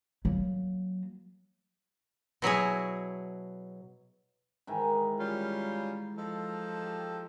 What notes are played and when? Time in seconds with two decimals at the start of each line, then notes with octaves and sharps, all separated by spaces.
0.25 F#3 A#3
2.42 B2 F#3 E4 G#4
4.67 G#2 D#3 E3
5.19 G3 C#4 F4
6.17 F3 D#4 A4
6.84 G4